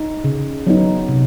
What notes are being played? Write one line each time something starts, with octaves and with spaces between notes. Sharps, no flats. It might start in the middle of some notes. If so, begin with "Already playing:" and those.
Already playing: D#4
C#3
F#3 B3 D#4
C3